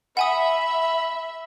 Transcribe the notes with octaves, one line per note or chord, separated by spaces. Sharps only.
E5 F#5 G#5 B5 D#6